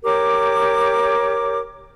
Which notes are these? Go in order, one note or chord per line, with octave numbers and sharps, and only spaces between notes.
G4 A#4 C#5 D6